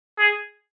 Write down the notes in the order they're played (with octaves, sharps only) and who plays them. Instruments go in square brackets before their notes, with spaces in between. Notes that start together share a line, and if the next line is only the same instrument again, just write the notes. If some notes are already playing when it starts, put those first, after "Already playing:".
[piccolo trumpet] G#4